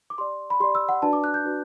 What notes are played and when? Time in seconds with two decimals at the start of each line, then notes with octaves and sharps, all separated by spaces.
0.10 D6
0.18 G4 D5 C6
0.50 B5
0.60 G4 C6
0.64 D5
0.75 E6
0.89 F#5
1.02 D4 F#4 B4 D5 A5
1.13 D6
1.24 F#6
1.34 G6
1.44 D4 F#4 B4 D5